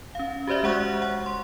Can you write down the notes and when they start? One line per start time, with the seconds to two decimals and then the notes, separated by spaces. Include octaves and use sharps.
0.15 C#4 F5
0.47 F#4 G4 C5 D5 E5
0.63 G#3 C5 F#5 C#6 F#6
1.02 F#5
1.26 C6